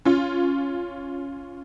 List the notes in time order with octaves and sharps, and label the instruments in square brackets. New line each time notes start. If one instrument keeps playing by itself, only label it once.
[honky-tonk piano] C#4 F4